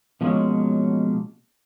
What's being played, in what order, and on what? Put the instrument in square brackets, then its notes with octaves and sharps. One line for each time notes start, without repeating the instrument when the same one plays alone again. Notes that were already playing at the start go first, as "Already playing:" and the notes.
[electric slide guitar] B2 F3 F#3 G#3 A#3 C#4